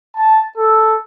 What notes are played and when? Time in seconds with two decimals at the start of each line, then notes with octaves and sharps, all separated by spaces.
0.15 A5
0.56 A4